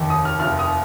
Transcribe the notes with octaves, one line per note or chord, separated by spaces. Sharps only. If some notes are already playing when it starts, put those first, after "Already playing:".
Already playing: F1 D#2 D#3
D#6
F6
F1 D#2 D#3 F6
D#6